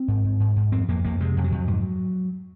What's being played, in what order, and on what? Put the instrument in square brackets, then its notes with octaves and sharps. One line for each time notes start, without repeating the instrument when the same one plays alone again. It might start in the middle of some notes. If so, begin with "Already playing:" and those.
Already playing: [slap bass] C4
G#2
G#2
G#2
G#2
F2 C4
F2 A#3
F2 A#3
C3 G#3
F2
F#3
F2
G#2